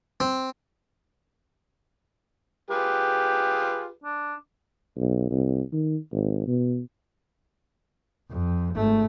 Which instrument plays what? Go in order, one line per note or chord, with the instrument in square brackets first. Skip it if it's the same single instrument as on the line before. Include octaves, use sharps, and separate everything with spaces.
[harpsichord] C4
[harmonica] F4 G#4 B4 [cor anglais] G4
[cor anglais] D4
[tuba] B1
C2
D#3
G#1
B2
[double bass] F2
G#1 A3